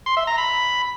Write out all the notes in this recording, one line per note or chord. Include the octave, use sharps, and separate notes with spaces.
C6
E5
A#5
B5